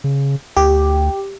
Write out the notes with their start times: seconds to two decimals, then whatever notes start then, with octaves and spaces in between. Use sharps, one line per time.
0.04 C#3
0.57 D2 G4